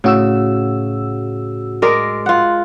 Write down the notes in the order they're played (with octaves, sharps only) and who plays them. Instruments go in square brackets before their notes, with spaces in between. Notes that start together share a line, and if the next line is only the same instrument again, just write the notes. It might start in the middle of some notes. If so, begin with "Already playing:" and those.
[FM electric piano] A2 F#4 E6 [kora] C#3
[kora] G#3 A#4 D5
F4 F#5